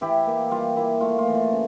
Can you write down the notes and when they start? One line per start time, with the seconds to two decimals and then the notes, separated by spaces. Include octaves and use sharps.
0.01 E3 E4 G4
0.27 A#3
0.51 G3 F4
0.76 A#3 E4
1.01 A3 F4
1.19 F4
1.27 E3
1.35 F4
1.52 C#3